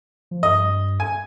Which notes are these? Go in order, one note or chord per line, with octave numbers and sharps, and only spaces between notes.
F3
G2 D#5
G#5